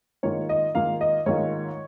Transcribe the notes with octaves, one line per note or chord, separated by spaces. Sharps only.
G#2 D#3 A#3 F4 C#5
D#5
G#2 D#3 A#3 F4 F5
D#5
G#2 D#3 A#3 F4 C#5